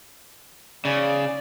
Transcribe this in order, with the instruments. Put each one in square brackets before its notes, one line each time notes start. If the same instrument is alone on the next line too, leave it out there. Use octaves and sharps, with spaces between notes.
[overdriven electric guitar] C#3 [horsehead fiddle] D5